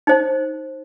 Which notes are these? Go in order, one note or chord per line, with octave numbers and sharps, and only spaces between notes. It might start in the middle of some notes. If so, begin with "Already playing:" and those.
D#4 C5